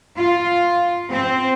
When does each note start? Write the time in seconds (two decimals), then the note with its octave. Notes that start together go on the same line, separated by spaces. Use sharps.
0.17 F4
1.11 C4